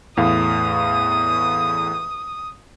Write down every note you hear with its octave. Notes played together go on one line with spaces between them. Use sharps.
E2 A2 F5 D#6